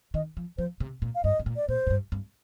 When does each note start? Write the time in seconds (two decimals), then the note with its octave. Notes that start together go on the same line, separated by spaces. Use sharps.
0.14 D#3 D#5
0.37 F3
0.58 F3 C5
0.80 C3
1.02 A#2
1.15 F5
1.24 G2 D#5
1.39 A2
1.46 A#2
1.56 D5
1.69 A#2 C5
1.87 A2
1.90 G2
2.12 G2